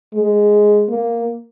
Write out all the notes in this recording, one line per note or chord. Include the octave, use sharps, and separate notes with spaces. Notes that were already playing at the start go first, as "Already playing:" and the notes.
G#3
A#3